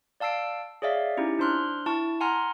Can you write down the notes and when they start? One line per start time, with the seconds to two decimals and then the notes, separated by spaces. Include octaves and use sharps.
0.20 D5 F5 A5 E6 C7 D7
0.82 G#4 C#5 D5 E5 F5
1.17 C#4 D#4 E4 G4
1.39 D4 C5 C6 F6 F#6
1.86 E4 A5 C#6
2.20 F#5 G#5 A#5 C6 F6